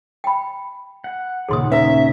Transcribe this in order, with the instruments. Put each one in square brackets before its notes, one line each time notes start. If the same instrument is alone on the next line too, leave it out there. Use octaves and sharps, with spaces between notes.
[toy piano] G5 B5
[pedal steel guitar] F#5
[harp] D#2 A#2 C#3 [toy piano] G#4 C6 D#6
[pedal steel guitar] C#4 A#5 [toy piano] B4 [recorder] E5